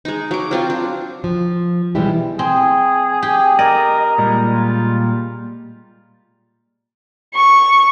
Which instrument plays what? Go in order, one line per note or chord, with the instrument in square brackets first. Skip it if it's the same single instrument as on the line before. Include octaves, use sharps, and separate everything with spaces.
[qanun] G#3 D#4
F#3 D6
F#3 C4 F4
D4
[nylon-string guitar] F3
B2 E3 G3 G#3 E4 G4
[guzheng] C4 [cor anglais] G#4
[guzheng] G4
[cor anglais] A#4 [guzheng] D5 [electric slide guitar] D#5
[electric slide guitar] A#2 G3 G#3
[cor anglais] F4
[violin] C#6